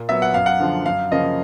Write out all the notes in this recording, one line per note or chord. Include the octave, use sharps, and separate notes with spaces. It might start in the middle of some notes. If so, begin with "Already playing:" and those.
Already playing: A#2
F#3 B3 E5
F#5
F#2 F5
F#5
D3 F3
F#2 F5
C#3 F3 A#3 D#5